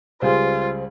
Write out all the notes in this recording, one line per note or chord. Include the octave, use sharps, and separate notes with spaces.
C#2 G3 F4 G#4 C5